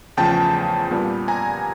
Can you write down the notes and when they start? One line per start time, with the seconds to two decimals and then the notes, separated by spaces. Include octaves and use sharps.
0.17 E2 C#3 F3 A3 G5 A5
0.91 A#2 G3 B3
1.28 G#5 A#5